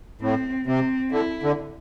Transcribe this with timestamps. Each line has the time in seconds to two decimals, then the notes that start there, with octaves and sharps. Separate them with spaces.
0.21 A2 C4
0.66 C3 C4
1.11 D3 E4
1.43 D3